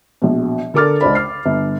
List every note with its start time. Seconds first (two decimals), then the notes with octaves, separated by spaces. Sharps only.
0.22 A#1 B2
0.74 D3 A4 A#4 D6 F6 A6
1.01 C#2 D4 C5 B5
1.15 F6 C7
1.45 G1